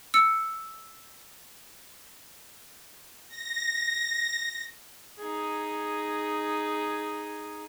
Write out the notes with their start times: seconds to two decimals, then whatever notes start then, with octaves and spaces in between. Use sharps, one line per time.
0.14 E6 C#7
3.28 A#6
5.19 D#4 G#4